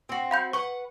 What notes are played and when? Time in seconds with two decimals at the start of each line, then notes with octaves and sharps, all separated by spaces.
0.09 C4 F#4
0.31 F5 B5 G6
0.53 B4 F#5 C#6